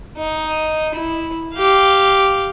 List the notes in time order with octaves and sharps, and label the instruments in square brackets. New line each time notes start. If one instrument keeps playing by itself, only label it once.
[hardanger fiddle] D#4
E4
G4 F5